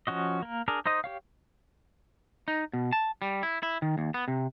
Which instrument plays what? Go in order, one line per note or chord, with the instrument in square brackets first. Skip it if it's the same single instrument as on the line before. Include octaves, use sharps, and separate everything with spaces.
[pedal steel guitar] F3 C#4 F#4 D#5
A#3 A#4
D4 G#4 A#4
D#4 C5 D#5 D#6
G4 C#5 F5
[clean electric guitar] D#4
B2
A5
G3
E4
E4
D#3
D#2
B3
C3